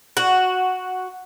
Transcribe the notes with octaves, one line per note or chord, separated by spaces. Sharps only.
F#4